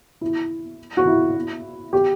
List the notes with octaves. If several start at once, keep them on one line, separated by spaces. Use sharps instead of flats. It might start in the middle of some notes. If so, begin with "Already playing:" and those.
E4
F#4
E4
G4